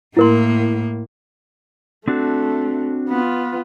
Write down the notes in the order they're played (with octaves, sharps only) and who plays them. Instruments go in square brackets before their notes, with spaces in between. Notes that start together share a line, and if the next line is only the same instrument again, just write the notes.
[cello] A2 A#3 [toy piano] E4 A#4 C6
[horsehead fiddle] A3 [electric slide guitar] C4 D4 F#4
[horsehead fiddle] B3 F4